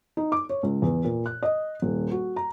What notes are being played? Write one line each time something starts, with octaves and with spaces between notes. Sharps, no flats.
D#4
D6
C#5
C#2
E2
A#2
F#6
D#5
D#1
F#4
A#5